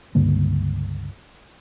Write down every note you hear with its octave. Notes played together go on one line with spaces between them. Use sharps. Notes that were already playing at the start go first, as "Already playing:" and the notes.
C#2 G2 D3 A#3